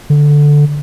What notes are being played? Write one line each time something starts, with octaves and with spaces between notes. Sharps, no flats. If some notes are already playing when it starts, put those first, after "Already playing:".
D3